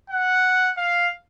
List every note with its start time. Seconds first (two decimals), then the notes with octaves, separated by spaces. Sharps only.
0.10 F#5
0.77 F5